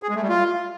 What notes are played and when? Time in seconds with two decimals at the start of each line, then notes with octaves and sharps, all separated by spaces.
0.03 G#4
0.09 G#3
0.16 A3
0.22 G3
0.29 F4